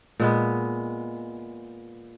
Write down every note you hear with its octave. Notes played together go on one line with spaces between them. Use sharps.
A#2 G#3 B3